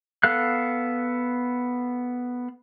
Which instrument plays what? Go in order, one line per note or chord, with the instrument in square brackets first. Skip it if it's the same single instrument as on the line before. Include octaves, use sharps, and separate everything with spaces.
[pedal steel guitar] B3 A4 F5 F#6